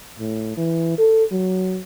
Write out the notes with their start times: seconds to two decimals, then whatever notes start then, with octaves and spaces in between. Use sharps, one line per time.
0.19 A2
0.57 E3
0.98 A4
1.31 F#3